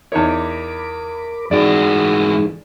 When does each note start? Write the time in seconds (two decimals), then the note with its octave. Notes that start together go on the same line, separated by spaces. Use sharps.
0.12 E2 D#4 A#4 C#5 B5 D6
1.51 G#2 E3 D#4 F#4 G#4 D5